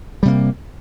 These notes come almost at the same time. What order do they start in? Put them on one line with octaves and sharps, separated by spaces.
G3 C3 A#3